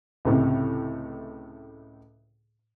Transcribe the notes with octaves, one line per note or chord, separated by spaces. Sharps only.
C#2 A2 C3